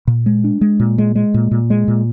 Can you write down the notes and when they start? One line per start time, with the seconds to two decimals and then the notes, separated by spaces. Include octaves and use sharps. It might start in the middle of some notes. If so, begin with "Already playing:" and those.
0.07 A#2
0.26 G#3
0.44 D4
0.61 G#3
0.80 A#2
0.98 G#3
1.15 G#3
1.34 A#2
1.51 A#2
1.70 G#3
1.88 A#2